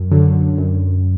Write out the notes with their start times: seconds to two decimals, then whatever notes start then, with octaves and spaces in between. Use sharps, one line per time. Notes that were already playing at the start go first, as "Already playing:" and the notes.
Already playing: F#2
0.11 D3 F#3
0.58 F#2